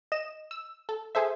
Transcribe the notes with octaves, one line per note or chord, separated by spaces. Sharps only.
D#5 E7
E6
A4
G#4 A4 C5 E5